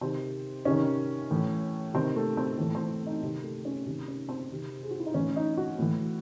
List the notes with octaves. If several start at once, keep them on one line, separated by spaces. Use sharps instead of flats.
C3 D#3 C4
C3 D#3 C#4
A2 E3
C3 D#3 C4
A3
C4
A2 E3 A3
C4
D#4
C3 D#3
A3
C#4
C3 D#3 C4
C#4
C4
C3 D#3
G#4
F#4
E4
D#4
A2 E3 C#4
D#4
F#4
A2 E3